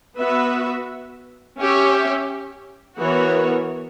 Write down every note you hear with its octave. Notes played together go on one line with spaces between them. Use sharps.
B3 F#4 B4 E5
C#4 G4 C#5 E5
E3 B3 F#4 A#4 C#5